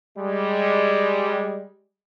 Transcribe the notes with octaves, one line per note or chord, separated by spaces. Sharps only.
G3 G#3